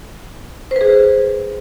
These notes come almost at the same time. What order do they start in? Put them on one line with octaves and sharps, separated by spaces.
C5 B4 G#4